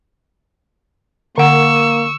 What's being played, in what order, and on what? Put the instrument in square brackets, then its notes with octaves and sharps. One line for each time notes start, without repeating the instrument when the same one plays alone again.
[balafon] D3 F#5 [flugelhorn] A#3 [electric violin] C#6 E6